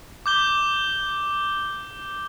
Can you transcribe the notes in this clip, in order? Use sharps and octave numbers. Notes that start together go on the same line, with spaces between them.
D6 G6 G7